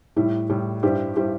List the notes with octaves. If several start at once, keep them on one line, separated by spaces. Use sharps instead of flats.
A2 G3 E4
A2 G3 E4
G2 G3 E4 G4 C5
G3 E4 G4 C5